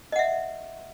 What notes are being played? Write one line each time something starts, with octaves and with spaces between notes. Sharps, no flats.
D#5 E5 F#5